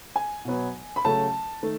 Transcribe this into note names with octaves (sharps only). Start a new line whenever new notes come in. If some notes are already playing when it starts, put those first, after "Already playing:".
G#5
B2 F#3 B3
B5
C#3 F#3 A3 A5
D#3 A3